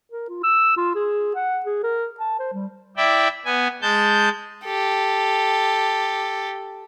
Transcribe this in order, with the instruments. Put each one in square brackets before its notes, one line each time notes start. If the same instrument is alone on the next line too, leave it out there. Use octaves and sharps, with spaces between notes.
[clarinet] A#4
F4
E6
F4
G#4
F#5
G#4
A#4
A5
C5
G3
[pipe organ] E4 D5 E5 G5
B3 G#5
G#3 A5 G6
[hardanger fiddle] G4 A4